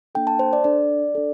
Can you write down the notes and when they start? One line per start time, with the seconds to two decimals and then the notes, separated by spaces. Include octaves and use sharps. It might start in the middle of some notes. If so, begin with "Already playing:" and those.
0.15 A#3 D4 A4 G5
0.27 A5
0.39 C5
0.53 D5
0.64 D4 A4 D5
1.15 D4 A4